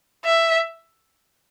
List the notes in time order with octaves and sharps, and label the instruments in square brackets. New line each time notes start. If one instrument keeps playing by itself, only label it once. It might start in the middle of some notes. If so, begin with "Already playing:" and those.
[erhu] E5